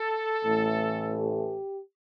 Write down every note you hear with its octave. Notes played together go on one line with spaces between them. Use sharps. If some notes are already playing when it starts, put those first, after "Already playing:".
Already playing: A4
A1 A2 E3 A3
G4